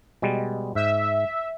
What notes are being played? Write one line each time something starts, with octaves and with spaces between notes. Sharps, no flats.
B2 G3 G#3
G#2 E5